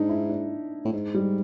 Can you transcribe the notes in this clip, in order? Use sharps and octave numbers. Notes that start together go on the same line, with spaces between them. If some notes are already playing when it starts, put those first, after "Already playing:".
Already playing: G#2 D4 D#4
E4
D4
A2
G#2
G3